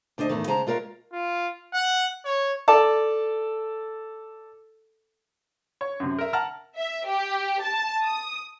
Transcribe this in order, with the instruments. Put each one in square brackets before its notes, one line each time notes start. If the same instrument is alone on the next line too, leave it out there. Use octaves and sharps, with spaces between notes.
[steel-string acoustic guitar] D2 D4 C5 D#5
E2 A2 D#3
C#3 G#3 C5 A5 A#5
G#3 F4 A#4 C#5 F5
[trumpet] F4
F#5
C#5
[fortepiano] A4 D5 A5
C#5
F#2 C3
A#4 E5
F#5 A5 A#5 F6
[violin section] E5
G4
A5
D#6